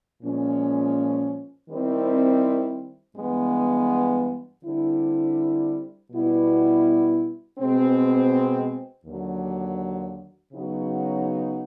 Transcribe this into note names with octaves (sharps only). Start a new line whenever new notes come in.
A#2 F3 G#3 C#4
D#3 G3 C4 E4
G2 E3 G#3 B3
D3 G3 C4 E4
B2 G3 B3 E4
B2 G#3 C4
D#2 D3 F#3
C#3 F#3 B3 D#4 F#4